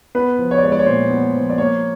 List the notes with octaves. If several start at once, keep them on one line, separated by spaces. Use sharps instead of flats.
B3 B4
F3
C#5
D5
G#3 C#5
D5
C#5
A#2 C5
B3
F3
D5
A#3 C#5